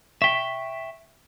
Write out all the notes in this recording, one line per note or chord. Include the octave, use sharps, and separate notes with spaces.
E5 G5 C#6 B6